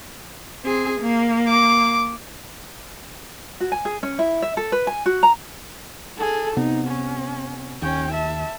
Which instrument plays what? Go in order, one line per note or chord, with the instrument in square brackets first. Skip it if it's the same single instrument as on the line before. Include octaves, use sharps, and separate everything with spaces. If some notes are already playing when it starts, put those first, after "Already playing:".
[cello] C4 G#4
A#3
[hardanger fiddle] D6
[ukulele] F#4
G#5
G#4
C#4
E4
E5
A4
B4
G#5
F#4
A#5
[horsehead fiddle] G#4 A4
[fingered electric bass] C3 B3 [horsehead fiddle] D#4
[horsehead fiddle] C#4
[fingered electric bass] D#2 [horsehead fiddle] C#4 G5
[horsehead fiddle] E5 A5